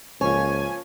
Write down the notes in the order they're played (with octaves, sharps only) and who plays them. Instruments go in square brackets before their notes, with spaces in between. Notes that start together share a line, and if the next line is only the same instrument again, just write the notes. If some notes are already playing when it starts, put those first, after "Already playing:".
[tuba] C#2 [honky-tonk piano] F3 A#3 C#4 [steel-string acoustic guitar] C#5 [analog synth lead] G#5